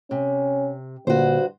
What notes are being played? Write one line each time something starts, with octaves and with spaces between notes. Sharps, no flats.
C3 C#4
G2 A#2 D3 F#4 C5